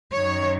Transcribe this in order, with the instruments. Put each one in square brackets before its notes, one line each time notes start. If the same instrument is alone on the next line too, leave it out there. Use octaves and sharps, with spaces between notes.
[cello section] F#2 D#3 F#3 C#5